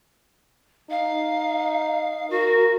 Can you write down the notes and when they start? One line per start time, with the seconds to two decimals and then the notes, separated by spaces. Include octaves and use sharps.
0.90 D#4 F5
2.30 F#4 A#4